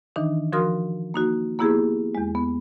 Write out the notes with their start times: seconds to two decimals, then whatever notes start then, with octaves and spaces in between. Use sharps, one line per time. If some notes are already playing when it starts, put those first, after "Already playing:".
0.16 D#3 E3 D4 D#4
0.53 F3 F#4 A#4 C6 D#6 F6
1.14 A#3 D#4 F#4
1.59 A#3 B3 E4 G4 G#4
2.15 E2 G#3
2.35 B3